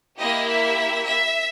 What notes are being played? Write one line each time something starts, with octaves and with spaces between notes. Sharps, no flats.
A#3 E4 G4 D#5
E5
E5